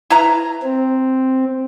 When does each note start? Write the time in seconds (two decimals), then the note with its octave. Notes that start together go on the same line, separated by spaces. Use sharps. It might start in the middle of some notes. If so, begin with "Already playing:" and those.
0.10 E4 B4 A#5
0.63 C4